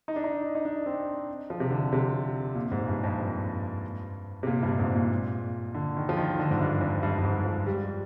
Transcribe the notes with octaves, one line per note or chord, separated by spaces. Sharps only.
D#4
D4
D#4
D#4
D4
C4
F3
C3
D3
C3
A#2
G#2
G2
F2
G2
C3
A#2
G2
G2
G#2
A#2
D3
D#3
F3
D#3
D3
G#2
G2
F2
G2
G2
G#2
F3
G3